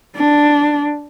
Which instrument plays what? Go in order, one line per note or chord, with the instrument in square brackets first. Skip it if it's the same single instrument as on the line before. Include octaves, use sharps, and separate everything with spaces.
[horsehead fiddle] D4